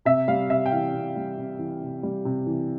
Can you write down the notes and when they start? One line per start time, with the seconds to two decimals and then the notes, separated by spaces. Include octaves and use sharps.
0.05 C3 E5
0.28 G3 F5
0.50 C3 E5
0.66 G5
0.72 E3 F5
0.94 C3
1.16 G3
1.37 C3
1.59 E3
1.82 C3
2.03 G3
2.25 C3
2.46 E3